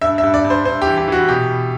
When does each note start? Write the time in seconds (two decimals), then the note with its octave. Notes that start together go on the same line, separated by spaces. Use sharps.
0.02 G2 E5
0.18 E5
0.24 G2
0.34 D5
0.45 G2
0.50 C5
0.65 G2 C5
0.82 G4
0.87 E3
0.98 G4
1.08 E3 F#4
1.28 B2 G4
1.50 B2